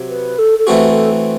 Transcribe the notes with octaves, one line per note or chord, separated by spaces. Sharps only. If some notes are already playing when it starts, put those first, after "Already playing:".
Already playing: C3 F#3
B4
A4
A4
E3 A3 C4 F#4 G4
A4